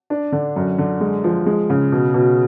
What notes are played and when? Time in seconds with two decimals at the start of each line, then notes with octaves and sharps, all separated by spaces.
0.10 D4
0.32 D3
0.56 F#2
0.78 D3
1.01 G#3
1.24 F3
1.46 G#3
1.70 C#3
1.92 B2
2.14 B2